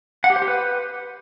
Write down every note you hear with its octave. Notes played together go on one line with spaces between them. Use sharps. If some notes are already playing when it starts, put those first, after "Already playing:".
F#5
G4
C5
G4
B4